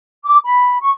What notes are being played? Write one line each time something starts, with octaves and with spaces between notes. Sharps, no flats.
D6
B5
C#6